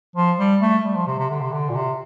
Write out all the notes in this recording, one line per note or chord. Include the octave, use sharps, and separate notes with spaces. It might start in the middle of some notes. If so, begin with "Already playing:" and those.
F3
G3
A3
G3
F3
C3
C3
D3
C3
D3
A#2
C3